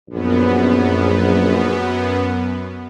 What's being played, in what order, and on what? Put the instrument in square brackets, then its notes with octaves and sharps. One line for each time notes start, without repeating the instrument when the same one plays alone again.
[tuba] A#1 [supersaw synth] F#2 B3